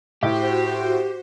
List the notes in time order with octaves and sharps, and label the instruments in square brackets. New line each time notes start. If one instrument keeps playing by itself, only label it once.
[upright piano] A2 [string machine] F#4 C5 [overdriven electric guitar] G4